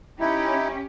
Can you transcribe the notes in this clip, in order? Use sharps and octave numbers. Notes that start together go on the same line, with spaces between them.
C#4 D#4 E4 G4